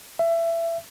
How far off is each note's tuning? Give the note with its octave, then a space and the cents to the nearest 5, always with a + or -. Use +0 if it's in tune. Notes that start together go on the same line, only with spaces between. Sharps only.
E5 +25